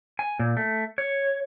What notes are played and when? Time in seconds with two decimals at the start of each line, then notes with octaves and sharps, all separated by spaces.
0.19 G#5
0.39 A#2
0.57 A3
0.98 C#5